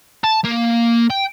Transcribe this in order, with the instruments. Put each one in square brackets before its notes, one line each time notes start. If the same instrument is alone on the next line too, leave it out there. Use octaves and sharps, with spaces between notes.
[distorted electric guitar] A5
A#3
G5